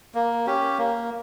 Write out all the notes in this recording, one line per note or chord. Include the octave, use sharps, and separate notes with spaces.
A#3
C#4 G4
A#3